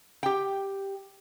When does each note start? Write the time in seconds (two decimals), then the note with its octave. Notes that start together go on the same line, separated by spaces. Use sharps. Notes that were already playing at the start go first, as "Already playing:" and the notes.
0.23 G4 G5